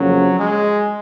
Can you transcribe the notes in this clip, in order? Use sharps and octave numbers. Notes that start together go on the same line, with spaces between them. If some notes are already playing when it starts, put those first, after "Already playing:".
Already playing: F2 C#3 F3 F#3 A#3 C#4
G#3